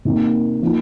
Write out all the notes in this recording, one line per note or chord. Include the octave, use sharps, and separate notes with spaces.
C3 D#3 A#3
F3 A#3 D#4